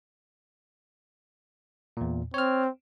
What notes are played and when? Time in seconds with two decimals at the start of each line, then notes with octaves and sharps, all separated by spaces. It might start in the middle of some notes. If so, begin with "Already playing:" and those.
1.97 E2 A#2
2.34 C4 C#5 F6